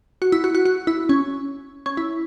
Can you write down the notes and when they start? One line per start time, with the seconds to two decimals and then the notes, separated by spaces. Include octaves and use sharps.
0.22 F#4
0.32 E4
0.44 F#4
0.55 F#4
0.65 F#4
0.87 E4
1.09 C#4
1.86 C#4
1.97 E4